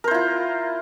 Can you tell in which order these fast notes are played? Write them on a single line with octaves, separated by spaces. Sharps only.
A#4 C5 E4 F4